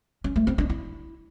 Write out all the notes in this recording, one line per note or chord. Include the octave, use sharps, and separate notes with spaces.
C#4
A3
C4
D4
E4